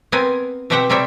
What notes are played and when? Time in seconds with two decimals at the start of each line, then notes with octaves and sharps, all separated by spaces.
0.12 B3 C4 A#4 G#5
0.70 B2 C4 G4 E5 F#5 G5
0.89 C3 G3 C4 C#5 E5 G5